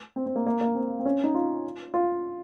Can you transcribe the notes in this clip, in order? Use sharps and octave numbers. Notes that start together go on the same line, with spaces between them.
C4
C4
A#3
A#3
A#3
C4
C4
C#4
D#4
F4
F4